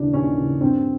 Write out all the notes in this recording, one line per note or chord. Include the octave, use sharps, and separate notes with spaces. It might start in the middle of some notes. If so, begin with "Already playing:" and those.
Already playing: D#2 C#3 E3 D4
D#2 C#4
C#3 E3
G2 C4